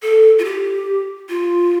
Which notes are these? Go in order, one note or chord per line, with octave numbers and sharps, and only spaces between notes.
A4
F4
G4
F4